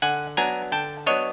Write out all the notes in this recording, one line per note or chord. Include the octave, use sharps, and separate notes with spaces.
D3 F#5 G#5
F#3 B3 D4 G#5 A#5
D3 G5 A5
F#3 B3 D4 C#5 D#5